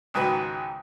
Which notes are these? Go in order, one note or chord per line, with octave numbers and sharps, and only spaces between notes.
C#2 G#2 D#3 F#3 B4